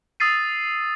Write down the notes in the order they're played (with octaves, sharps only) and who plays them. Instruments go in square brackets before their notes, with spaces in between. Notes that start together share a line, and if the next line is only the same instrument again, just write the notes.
[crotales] D#6 E6 A6 C7 D#7